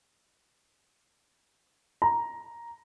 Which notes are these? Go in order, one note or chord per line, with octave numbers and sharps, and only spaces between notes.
A#5